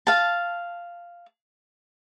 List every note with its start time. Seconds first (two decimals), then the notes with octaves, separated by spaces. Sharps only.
0.07 F5 A5